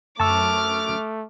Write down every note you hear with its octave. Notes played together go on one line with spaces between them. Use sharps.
F#2 A3 A5 C#6 D6 E6 F6